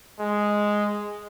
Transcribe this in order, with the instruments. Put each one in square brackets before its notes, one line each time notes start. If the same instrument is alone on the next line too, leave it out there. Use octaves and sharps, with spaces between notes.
[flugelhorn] G#3